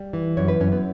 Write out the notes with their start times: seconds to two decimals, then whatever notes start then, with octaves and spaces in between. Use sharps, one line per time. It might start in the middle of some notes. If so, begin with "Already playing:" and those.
Already playing: G3 G4
0.13 E3
0.37 F#2 C#5
0.48 B4
0.60 F#2 C#4
0.72 B3